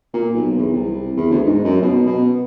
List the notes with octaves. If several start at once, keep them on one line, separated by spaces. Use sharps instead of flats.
A#2
B1
E2
C2
E2
D2
G#2
F#2
B2
B2